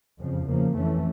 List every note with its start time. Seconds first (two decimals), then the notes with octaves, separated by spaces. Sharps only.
0.19 F2 C#3 F3
0.46 E2 C#3 F3 A#3
0.74 F2 E3 A3 C#4